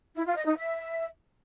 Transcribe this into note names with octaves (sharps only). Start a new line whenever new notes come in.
E4
F4
D#5
D#4
E5